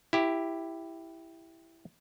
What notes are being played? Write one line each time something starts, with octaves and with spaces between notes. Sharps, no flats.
E4 G4